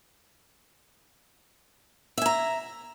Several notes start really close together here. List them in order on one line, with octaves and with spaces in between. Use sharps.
E5 G#5 A#5